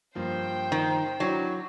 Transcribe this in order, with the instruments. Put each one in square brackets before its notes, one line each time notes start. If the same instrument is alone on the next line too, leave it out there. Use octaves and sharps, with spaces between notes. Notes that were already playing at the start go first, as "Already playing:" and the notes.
[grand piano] G2 F3 A#3 [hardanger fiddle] C5 G5
[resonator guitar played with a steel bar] D#3
[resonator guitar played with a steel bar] F#3 [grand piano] D4 E4 F#4